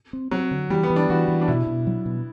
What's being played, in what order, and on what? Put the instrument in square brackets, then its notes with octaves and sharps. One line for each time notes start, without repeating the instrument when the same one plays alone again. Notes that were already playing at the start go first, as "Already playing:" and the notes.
[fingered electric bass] C4
[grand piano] F#3 [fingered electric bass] C4
[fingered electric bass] D3
[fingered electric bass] E3 [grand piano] G3
[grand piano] B3
[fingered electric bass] E3
[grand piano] D4
[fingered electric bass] E3 [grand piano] F#4
[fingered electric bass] E3
[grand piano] D4
[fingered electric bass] B2 [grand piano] E4
[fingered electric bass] B2
F#3
B2